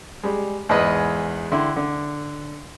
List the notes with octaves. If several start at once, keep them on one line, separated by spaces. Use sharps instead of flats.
G3 G#3
E2 G#2 G#4 B4 D#5 B5
D3 E4 G5 C6
D3